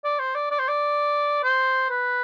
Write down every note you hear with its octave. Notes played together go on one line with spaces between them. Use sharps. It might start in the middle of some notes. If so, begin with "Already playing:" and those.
D5
C5
D5
D5
C5
D5
C5
B4